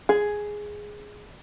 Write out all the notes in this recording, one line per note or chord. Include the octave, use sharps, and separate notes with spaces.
G#4